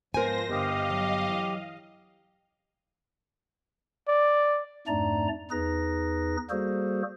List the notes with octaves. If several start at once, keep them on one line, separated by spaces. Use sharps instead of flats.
G#2 F3 B3 F4 A#4 C5 G#5 A#6
G1 G4 D#5 F5
F#3
E3
D5
F2 G#2 A3 D4 D5 A#5
E2 D#4 G#4 B4 A#6
G3 A#3 F#4 G#4 A4 C5